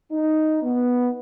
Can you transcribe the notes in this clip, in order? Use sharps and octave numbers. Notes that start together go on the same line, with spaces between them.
D#4
B3